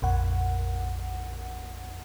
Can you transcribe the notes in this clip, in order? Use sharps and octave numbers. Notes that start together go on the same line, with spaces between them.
A#1 F2 F#5